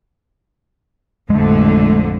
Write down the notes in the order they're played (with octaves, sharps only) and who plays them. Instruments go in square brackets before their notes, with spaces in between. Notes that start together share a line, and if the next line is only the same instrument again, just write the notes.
[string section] A1 F2 D3 [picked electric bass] G#3 A3